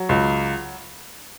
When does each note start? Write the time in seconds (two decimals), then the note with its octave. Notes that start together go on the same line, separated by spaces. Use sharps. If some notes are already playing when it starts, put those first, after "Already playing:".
Already playing: F#3
0.09 C#2